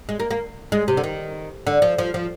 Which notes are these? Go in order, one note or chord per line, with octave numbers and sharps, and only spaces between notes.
G#3
A#3
A#3
G#3
C3
D3
D#3
D3
F3
F3
F3